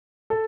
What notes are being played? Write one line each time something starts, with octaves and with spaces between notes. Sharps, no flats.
A4